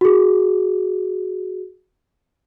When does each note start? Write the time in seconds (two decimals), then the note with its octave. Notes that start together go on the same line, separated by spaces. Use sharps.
0.01 F#4 G#4